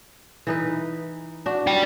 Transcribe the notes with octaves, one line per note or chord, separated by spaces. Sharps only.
E3 D#4 B4
D4 F#4
D5 G5